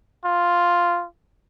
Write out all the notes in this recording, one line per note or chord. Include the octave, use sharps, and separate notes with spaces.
F4